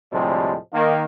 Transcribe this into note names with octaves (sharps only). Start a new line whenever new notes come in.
D2 A2 C3 F3 G3 G#3
D#3 A#3